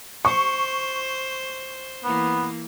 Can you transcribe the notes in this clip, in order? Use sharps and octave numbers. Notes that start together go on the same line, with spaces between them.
C5 C#6
E3 A#3 B3